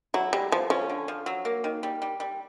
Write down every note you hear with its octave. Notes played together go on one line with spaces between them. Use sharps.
F#3 E4
G3 G#3
F3 B3
F3 C#4
D3
F3
F#3
A#3
D#3
G3
G3
G3